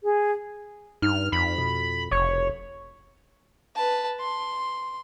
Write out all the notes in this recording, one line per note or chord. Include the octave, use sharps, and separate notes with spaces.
G#4
G2 D#4 F6
F2 B5
B2
F1 C#5
B4 A5
C6